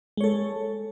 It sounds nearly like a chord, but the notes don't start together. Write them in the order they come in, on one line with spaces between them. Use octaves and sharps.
G#3 C#5 A4